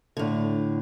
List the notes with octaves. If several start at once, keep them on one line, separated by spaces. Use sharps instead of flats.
A2 D3